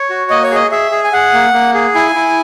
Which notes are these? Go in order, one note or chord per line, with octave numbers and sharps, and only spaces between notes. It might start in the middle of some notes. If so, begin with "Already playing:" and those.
Already playing: C#5
F#4
A#3 D#5
C#5
G#4 D#5
G#4 E5
G#4
G#5
G#4 F#5
A#3
A#3
G#4
E4 G#5
E4